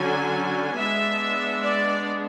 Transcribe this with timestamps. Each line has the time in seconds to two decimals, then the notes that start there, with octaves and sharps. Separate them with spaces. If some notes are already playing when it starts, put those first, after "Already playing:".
Already playing: D3 F#3 C#4 G#5
0.78 G#3 B3 D4 E5
1.63 D5